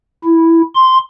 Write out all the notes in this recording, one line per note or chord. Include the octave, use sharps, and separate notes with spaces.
E4
C6